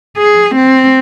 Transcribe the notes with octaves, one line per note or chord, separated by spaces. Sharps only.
G#4
C4